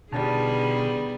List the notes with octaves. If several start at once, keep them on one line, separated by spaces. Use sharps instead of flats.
B2 D3 G3 B3 D#4 F4 G#4 A5